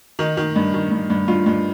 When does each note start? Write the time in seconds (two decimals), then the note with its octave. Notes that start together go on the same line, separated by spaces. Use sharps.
0.19 D#3 D#4
0.37 D#3
0.56 G2
0.74 D#3
0.91 G2
1.10 G2
1.28 G2 F4
1.46 G2